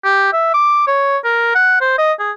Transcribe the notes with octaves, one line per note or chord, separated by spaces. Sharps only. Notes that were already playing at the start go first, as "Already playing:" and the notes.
G4
E5
D6
C#5
A#4
F#5
C5
D#5
G#4